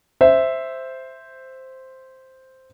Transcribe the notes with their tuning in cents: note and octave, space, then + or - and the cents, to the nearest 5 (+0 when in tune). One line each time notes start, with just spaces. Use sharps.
C5 +0 E5 +0